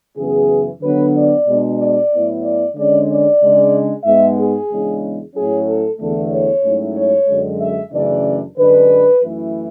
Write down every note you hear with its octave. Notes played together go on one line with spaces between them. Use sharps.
F#2 C#3 E3 B3 G#4
D3 F#3 B3 B4
D5
B2 G#3 D4
D5
A2 F#3 B3 E4
D5
D3 G#3 C#4 D5
D5
C#3 G#3 D4
G#2 G#3 B3 E5
G#4
E2 C#3 G#3 D4
A2 F#3 C#4 E4 G#4
A4
E2 D3 A3 A4
C#5
G#2 F#3 A3 C#4 E4
C#5
F#2 D3 G#3
E5
F#2 C#3 E3 A3 D4 D5
F#2 D3 G#3 D4 B4
F#2 E3 A3 E4